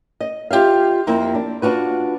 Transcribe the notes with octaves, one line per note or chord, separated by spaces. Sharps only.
D#5
F4 G4 E5 F5
F2 A#3 C4 E4
D4
D4 F4 F#4 B4